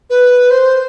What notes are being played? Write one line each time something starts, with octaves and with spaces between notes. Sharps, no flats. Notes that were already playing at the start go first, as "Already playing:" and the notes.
B4
C5